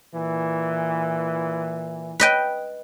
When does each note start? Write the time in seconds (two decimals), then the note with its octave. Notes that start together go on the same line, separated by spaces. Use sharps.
0.14 A#2 E3
2.20 B4 D#5 G5